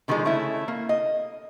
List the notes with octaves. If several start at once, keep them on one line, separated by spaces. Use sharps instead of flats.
D3 D#3 F3 G3 G#3
C#3 A3 C#4 E4
A#3
D#5